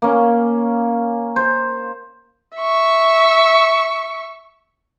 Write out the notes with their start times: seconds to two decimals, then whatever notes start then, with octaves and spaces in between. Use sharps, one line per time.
0.02 A#3 C#4
1.36 C5
2.57 E5 C#6